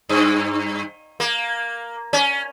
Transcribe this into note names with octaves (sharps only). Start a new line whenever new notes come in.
G2
A#3
C#4